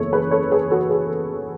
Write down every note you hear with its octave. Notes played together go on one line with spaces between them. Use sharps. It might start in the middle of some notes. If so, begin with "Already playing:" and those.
Already playing: F#1 E2 C#3 E3 A4 C#5
G#4 B4
A4 C#5
G#4 B4
F#4 A4
G#4